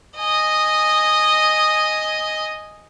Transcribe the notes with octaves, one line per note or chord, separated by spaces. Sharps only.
D#5 G#5